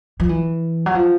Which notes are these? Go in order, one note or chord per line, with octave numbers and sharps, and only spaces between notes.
F3
E3
F#3
F3